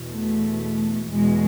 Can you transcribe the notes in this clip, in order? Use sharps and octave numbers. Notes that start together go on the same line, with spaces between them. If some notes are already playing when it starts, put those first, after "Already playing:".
Already playing: E2 B2
A3
E2 B2 G#3